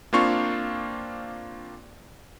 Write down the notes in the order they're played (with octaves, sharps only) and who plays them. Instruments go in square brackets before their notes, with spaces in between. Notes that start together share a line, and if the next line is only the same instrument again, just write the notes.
[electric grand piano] A#3 C4 D4 F4 F5 C#6